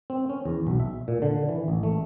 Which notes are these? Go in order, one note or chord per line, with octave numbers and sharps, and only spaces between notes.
C4
C#4
E2
B1
E5
A#2
D3
E3
A1
A3